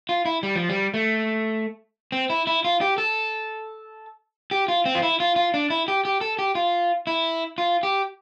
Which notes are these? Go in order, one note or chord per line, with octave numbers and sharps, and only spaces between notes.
F4
E4
G3
F3
G3
A3
C4
E4
E4
F4
G4
A4
G4
F4
C4
F4
E4
F4
F4
D4
E4
G4
G4
A4
G4
F4
E4
F4
G4